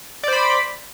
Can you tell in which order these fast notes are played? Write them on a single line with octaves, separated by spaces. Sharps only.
D5 C5 B5